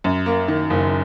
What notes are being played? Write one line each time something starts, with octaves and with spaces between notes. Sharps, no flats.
F#2
A#3
D#3
F#1